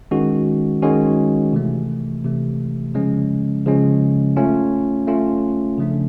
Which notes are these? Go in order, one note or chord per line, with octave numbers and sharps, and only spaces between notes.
D#3 G#3 C#4 F#4
D#3 G#3 C#4 F#4
C3 E3 A3
C3 E3 A3
C#3 F3 G#3 C#4
C#3 F3 G#3 C#4
A3 C#4 F4
A3 C#4 F4
C#3 F3 A3 D4